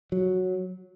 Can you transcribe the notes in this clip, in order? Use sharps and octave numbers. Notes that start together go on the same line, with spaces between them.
F#3